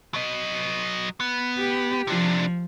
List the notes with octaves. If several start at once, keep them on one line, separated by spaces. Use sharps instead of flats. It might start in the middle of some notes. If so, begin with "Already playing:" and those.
F#3 D#5
B3
G4
C3 F3 D4